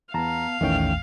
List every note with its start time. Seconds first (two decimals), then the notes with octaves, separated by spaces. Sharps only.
0.14 E2 B3 F5 A5 A#5
0.61 A#1 E2 D#3 E3 A3 C#4 G5